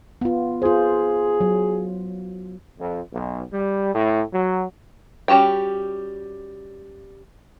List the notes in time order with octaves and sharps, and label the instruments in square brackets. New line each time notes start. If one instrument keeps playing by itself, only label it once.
[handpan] B3 F4
[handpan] F4 C5 [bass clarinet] G#4
[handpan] F#3
[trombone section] F2
B1
G3
A2
F#3
[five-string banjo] G3 C#4 F#4 G4 G5